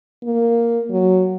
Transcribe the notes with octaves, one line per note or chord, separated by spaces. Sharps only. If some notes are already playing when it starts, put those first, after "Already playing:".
A#3
F#3